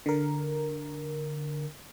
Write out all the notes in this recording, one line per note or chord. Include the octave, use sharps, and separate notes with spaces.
D3 A#4